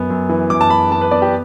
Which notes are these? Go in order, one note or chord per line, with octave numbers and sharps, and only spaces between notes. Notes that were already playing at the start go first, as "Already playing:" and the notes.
Already playing: F#2 B3
F#2
E3
F#2 D6
A5
F#2 B5
B3 A5
B4
B3 D5
G4